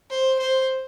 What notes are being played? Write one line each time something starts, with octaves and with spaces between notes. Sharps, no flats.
C5
C5